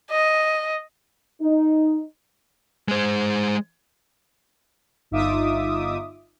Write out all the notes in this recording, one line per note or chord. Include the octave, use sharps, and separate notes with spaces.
D#5
D#4
G#3 C5
G1 D#4 F4 E5 D6 D#6